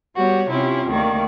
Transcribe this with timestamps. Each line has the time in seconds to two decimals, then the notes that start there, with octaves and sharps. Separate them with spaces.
0.15 G3 B3 F#4 G4 C#5
0.49 C3 C#4 E4 F4 G4
0.89 D2 D#3 A#3 D5 C#6